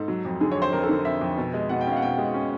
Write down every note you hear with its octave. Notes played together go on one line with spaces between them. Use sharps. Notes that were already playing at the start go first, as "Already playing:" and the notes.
Already playing: G#2 A4
F#3
F2
D3 G#4
C#5
F2 C5
F2 A#4
A4
D3
F2 E5
F2
B2
G#3
B2 F#5
G5
C#4
F5
F#5
B2 G5
G#3
C#4